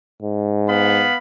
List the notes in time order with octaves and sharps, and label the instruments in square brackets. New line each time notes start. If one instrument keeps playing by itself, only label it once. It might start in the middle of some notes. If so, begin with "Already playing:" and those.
[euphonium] G#2
[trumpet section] B3 F5 B5